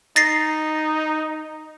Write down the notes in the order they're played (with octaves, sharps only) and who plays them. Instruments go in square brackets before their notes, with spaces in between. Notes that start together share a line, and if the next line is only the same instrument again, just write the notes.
[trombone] D#4 [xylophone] A6 A#6 C7